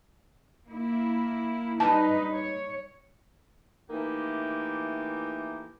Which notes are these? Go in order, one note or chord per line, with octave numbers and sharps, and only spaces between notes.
A#3 E4
G3 D#4 B4 A5
C#5
E3 A3 A#3 D#4 G4